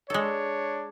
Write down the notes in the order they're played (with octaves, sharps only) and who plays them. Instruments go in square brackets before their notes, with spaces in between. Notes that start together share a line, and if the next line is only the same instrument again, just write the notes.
[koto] G#3 A4 [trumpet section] D4 C#5